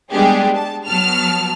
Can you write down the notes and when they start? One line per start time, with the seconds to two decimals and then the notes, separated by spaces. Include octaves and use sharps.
0.11 G3 G#3 B3 D4 G4 G#4
0.55 A5
0.85 F#3 B3 A5 F6